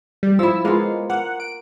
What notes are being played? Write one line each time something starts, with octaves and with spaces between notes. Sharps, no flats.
G3
F3 E4 E6
G#3 A#3 B3 F4
A#3 F#5
D7